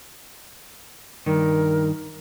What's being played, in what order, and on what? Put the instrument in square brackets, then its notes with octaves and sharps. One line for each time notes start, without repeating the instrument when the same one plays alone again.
[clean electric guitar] G2 D#3 [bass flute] A#4